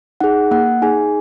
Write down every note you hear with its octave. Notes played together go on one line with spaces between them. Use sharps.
D#4 G#4 F#5
A#3 F#5
D#4 G#4 G#5